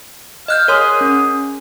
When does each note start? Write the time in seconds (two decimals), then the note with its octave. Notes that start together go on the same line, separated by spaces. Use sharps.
0.48 D#5 F5 F#6 G6
0.68 G#4 A#4 C#5 C6
1.01 C#4